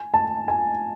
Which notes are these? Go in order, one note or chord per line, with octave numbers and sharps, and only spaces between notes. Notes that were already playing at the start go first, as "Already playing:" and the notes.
Already playing: G#5
A5
G#5